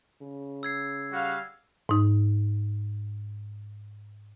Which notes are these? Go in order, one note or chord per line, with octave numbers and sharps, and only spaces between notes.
C#3
E6 G#6 C7
G3 F#4 F5
G#2 D#4